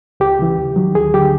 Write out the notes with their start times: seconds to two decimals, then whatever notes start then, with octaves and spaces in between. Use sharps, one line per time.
0.20 C#2 G4
0.39 C#3 E3
0.58 D#2
0.76 D#3 F#3
0.95 D2 G#4
1.14 D3 F#3 G4